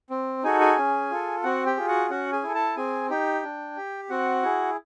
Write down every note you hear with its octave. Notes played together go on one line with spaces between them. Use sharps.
C4
D#4 F#4 G#4 A4 G#5
G#4 G#5
C#4
F4 A4
C4 F#4 F#5
G4 G5
F4 G#4
F#4 F#5
C#4 F#4 F#5
G#4 G#5
E4 A4
A4 A5
C4 G#4 G#5
D#4 G4 G5
D4
G4
C4 F#4 F#5
E4 G#4